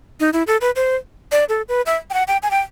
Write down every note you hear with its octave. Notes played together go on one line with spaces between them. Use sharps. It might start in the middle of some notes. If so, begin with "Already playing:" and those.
D#4
E4
A4
B4
C5
D5
A4
B4
E5
G5
F#5
G5
G#5
G5